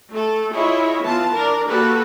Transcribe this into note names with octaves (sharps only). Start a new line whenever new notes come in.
A3 A4
E4 F4 G#4 C#5 D#5 E5
E3 B3 F4 A5
D4 A#4
A#3 F#4 G4 A4 B4